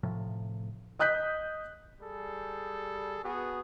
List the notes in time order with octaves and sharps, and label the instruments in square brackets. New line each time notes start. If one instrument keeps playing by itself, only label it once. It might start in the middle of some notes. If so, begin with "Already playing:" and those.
[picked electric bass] A2 C3 F3
[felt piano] D#5 D#6 F#6 G6 B6
[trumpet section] G3 G#4 A4
B3 F#4 G#4